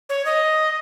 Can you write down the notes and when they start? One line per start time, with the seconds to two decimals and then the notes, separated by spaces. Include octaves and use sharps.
0.09 C#5
0.25 D#5